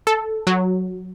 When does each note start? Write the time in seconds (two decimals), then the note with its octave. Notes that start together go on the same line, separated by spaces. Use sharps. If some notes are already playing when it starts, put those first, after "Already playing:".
0.07 A4
0.47 F#3